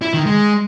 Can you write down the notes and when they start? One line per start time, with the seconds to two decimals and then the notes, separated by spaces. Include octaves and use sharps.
0.02 E4
0.14 D#3
0.26 G#3